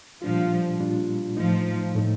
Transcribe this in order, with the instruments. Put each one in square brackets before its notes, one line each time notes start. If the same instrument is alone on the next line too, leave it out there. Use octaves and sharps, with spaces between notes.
[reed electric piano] A#2 G3 D4 F4 [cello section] F3
[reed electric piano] A#2 G3 D4 F4
[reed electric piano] A2 A3 D#4 [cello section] F3
[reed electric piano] A2 A3 D#4